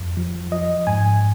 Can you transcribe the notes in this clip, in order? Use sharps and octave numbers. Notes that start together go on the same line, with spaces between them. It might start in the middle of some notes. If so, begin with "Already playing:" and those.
Already playing: F2
F3
F3 D#5
G#2 G#5